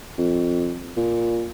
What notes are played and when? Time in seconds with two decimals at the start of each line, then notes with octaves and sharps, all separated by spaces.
0.18 F2
0.97 A#2